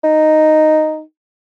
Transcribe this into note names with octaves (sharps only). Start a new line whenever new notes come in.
D#4